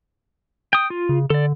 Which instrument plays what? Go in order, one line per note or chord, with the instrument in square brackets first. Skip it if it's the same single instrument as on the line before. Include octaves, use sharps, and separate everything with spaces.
[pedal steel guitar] G5 D#6
F4
[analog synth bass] C#3
[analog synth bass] D3 [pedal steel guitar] A4 D5